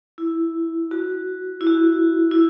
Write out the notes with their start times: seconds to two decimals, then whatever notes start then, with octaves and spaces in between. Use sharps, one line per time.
0.18 E4
0.91 F#4
1.61 E4
1.67 F#4
2.31 E4